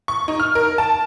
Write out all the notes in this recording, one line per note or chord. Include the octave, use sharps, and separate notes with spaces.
C#6
D#4
F6
A#4
A5